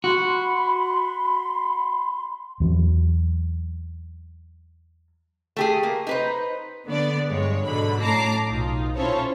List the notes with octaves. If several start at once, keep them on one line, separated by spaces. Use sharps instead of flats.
F#4 B5 C6
E2 F#3
A3 G4 G#4
A#3
D#4 B4 C5
D3 B3 D5
G2 G#3 C#5
G#2 B2 D3 F#3 B5
A2 C#4 A5 A#5 D6 C7
B1 D#4 F4
C#4 E4 F4 A4 C5 C#5